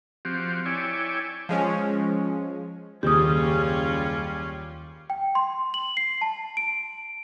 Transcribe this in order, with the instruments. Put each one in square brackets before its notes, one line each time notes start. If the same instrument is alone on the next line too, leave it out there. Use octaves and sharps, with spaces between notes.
[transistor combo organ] F3 C4 F#4 G4
E4 C#5 D5 G5 G#5
[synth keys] F3 G#3 C#4
[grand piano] F#1 [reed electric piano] D#2 [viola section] G3 C#4 F4 [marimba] G4 D#6
[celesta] G5
C6
F#7
C7
A5
D7